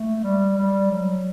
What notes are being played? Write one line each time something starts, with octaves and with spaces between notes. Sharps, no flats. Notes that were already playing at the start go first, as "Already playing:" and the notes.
Already playing: A3
G3
G3
F#3